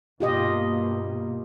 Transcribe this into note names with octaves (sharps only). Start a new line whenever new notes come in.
G2 B2 A#3 F4 G4 D#5